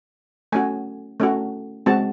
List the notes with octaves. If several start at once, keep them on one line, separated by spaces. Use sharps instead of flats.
A3 C#4 F#4 G#5
A3 C#4 F#4
G#3 C4 F#4 A5